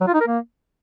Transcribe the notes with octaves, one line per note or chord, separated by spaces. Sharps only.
F#3
F4
D#4
A#4
A#3